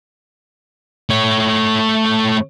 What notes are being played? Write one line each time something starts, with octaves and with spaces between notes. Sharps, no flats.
A3 C#5